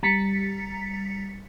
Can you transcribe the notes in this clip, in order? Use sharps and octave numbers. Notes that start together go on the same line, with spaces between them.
G3 A#5 A6 B6 C#7